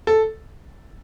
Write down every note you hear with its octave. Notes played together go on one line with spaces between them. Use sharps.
A4